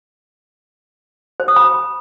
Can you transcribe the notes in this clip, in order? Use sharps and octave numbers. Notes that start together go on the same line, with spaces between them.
C5
D#6
B5